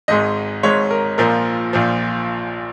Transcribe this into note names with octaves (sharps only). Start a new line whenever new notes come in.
G#1 G#2 G#3 D#5
G#1 G#2 G#3 C#5
A#4
A#1 A#2 F3 A#4
A#1 A#2 F3